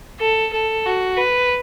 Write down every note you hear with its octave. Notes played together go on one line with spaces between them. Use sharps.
A4
A4
F#4
B4